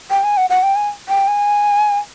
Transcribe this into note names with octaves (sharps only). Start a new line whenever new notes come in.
G5
G#5
F#5
F#5
G5
G#5
G5
G#5